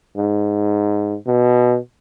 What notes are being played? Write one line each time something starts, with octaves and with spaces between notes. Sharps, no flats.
G#2
B2